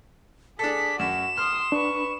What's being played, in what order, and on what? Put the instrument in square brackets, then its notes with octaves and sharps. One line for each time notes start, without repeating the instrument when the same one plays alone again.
[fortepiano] D4 A4 [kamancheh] G#4 D5 [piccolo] B6
[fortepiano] F#2 [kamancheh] F#4 [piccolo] E7
[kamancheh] C6 D#6 [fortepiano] F6
[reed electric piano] D4 [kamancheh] B4 C#6